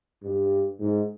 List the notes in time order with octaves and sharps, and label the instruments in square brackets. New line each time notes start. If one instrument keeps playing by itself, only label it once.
[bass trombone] G2
G#2